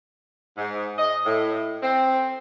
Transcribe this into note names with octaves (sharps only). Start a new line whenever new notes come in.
G#2
D#5
A2
C4